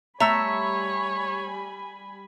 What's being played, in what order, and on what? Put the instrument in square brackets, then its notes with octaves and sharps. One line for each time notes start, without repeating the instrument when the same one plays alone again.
[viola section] G3 G#5 B5 [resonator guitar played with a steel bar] A3 E5 [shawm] C#5 [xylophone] A#5